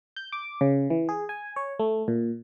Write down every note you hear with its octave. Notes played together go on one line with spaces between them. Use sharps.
G6
D6
C#3
E3
G#4
G#5
C#5
A3
A#2